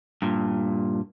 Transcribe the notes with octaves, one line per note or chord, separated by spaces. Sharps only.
G2 A#2